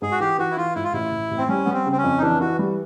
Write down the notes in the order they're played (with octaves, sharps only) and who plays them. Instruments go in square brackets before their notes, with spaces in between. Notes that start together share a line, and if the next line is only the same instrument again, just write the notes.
[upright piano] G#2 [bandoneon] G#4
[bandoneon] F#4
[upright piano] E3 [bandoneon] G4
[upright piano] E3 [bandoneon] F#4
[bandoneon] E4
[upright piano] E3 [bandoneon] F4
[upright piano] G#2 [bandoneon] E4
[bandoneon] F4
[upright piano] A1 [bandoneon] E4
[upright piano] A1
A1
[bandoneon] C4
[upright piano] G3 [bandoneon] C#4
[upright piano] G3 [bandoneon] B3
[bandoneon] C4
[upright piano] C#3
[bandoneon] C4
C#4
[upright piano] F2
[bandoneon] D#4
[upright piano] E3 [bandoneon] D4
[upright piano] E3 [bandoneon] F#4
[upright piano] G3